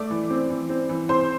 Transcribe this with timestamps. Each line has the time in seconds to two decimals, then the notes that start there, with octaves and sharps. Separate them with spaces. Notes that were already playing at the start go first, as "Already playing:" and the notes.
Already playing: A3 D5 D6
0.10 E3
0.30 C4
0.50 E3
0.69 C4
0.89 E3
1.09 C4 C5 C6